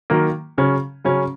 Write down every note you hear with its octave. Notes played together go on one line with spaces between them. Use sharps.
D#3 F#3 A#3
C#3 F#3 C#4
C#3 F#3 C#4